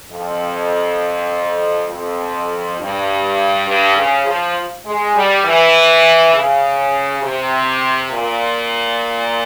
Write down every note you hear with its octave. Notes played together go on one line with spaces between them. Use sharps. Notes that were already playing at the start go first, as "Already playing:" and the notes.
F2
F2
G2
G2
C#3
F3
G#3
G3
E3
C#3
C3
A#2